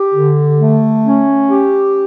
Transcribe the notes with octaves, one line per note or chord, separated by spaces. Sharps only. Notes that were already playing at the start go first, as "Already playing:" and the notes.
Already playing: G4
D3
A3
C#4
G4